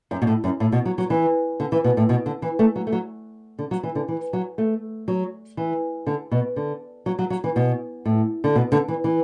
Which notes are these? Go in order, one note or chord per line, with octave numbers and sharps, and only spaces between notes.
F#2
B2
A2
F#2
A2
B2
F#3
F#3
E3
D3
E3
B2
A2
B2
D3
E3
A3
F#3
A3
F#3
D3
F#3
E3
D3
E3
F#3
A3
F#3
E3
D3
B2
D3
F#3
F#3
F#3
E3
B2
A2
D3
B2
D3
E3
E3